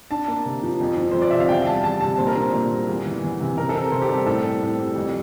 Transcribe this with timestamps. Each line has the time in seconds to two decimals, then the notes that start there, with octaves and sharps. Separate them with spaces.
0.11 D4 A5
0.28 A#3
0.45 C3
0.63 F3
0.81 F2
0.97 F3
1.11 F2 C5
1.22 D5
1.31 C3 E5
1.40 F5
1.49 E2 G5
1.67 G3 A5
1.84 E2 A5
2.01 C3 A5
2.18 A#2 C5
2.27 A#4
2.36 D4 C5
2.53 A#2
2.71 G3
2.88 E2
3.05 E3
3.22 E2
3.40 C3
3.58 C3 A#4
3.69 A4
3.75 C4 A#4
3.92 C3 C5
4.02 G4
4.09 G3 A4
4.26 A2 A4
4.44 C4
4.61 A2
4.79 G3
4.96 F2